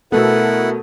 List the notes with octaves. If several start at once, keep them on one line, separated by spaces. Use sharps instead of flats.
B2 A3 B3 E4 A4 A#4 F#5